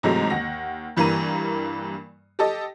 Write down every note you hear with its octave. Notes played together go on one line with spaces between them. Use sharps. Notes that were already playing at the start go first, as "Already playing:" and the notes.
G#2 C3 E3 F#3 G#3 A3
D#2 F#5 A#6
G2 E3 G3 A#3 A#5 D#7
G4 A4 D#5